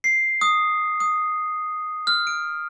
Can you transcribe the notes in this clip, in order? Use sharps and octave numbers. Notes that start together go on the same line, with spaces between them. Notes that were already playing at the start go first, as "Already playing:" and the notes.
C7
D#6
D#6
F6
D7